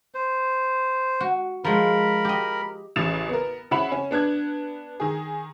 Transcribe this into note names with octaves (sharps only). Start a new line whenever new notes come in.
C5
F#4
F3 G#3 A#4 B5
G4 D#5
A1 C#3 A6 E7 F7
B3 A#4
C#3 E4 F#5 B5 E7
C#4
B3 D4 F#6 G#6
D#3 G#4